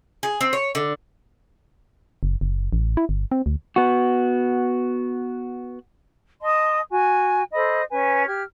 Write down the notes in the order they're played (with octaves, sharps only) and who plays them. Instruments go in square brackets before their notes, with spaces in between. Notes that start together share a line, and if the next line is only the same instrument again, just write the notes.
[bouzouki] G#4
C4
C#5
D3
[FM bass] F#1
F#1
A1
E4
G1
C4
D2
[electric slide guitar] B3 F#4
[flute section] D#5 A5 C6 D#6
F#4 G#5
A4 C5 D#5 B5
C#4 B4 G#5
G4 F6 G#6